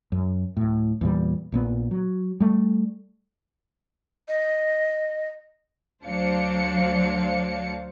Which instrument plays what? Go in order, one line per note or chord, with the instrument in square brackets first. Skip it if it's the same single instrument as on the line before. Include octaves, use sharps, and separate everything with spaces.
[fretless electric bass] F#2
D1 A2
E2 A#2 G3
A#1 A#2 B3
F#3
G3 A3
[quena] D#5
[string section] D2 F#3 D4 C5 F5 C#7